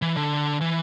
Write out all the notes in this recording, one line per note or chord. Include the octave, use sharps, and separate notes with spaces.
E3
D3
E3